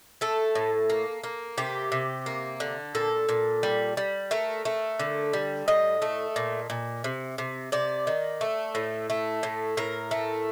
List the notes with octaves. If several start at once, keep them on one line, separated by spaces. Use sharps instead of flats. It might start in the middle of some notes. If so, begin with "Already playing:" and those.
A3 A4
A2
A#3
A#3
C3 G4
C3
A#3
D3
A#2 A4
A#2
G3
G3
A3 A#4
A3
D3
G3
A2 D#5
A3
A#2
A#2
C3
C3
C3 D5
D#3
A3
A2
A3
A2
A2 A#4
A3